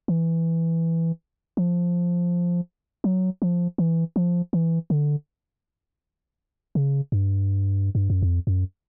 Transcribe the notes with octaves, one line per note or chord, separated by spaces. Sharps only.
E3
F3
F#3
F3
E3
F3
E3
D3
C#3
G2
G2
F#2
F2
F#2